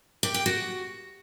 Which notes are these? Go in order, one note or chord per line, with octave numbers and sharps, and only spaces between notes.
G4
G5
F#4